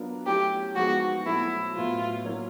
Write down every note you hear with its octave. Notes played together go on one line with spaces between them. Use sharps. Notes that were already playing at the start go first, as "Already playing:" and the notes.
Already playing: F#3 B3 D4 F4 A#4
F#3 A3 C#4 E4 G4
F3 G#3 B3 D#4 F#4 G#4
B2 F#3 A3 C4 E4
A2 F#3 B3 F4
F#3 A#3 C#4 E4